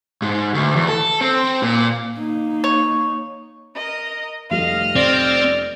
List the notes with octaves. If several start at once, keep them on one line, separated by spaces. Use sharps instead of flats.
G#2
D2
E2
A4
C4
A#2
A#3 D#4
C#5
A#4 D#5
F1 G3 A3 D#5 F5 F6
C4 D5